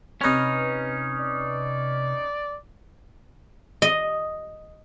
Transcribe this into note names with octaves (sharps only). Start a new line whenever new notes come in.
C3 C#4 D#4 B4 F6
D5
D#5